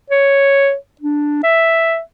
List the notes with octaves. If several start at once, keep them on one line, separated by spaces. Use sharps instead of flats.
C#5
D4
E5